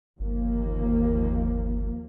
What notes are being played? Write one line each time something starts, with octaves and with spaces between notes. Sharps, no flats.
G1 D#2 F3 A#3